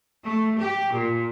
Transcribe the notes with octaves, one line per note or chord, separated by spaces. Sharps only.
A3
G4
A#2